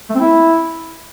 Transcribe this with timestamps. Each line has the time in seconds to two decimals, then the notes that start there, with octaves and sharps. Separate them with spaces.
0.10 A3
0.15 C4
0.20 E4